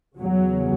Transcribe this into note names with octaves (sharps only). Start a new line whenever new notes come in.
E2 C#3 F#3